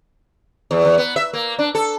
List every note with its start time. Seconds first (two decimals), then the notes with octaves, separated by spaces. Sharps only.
0.71 E2
0.85 E2
0.98 B3
1.16 E5
1.33 A#3
1.59 D4
1.75 A4